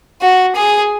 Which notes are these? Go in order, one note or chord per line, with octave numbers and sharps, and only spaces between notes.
F#4
G#4